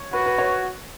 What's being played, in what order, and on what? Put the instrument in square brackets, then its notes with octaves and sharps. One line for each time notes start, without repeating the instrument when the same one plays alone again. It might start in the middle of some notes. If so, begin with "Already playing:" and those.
Already playing: [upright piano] C#5
[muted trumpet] F#4 [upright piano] B4
[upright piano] B4
C#5